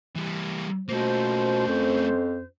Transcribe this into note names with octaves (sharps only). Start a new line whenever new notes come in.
E3 G3
B2 A3 A#3 C#4 F4 C5
F2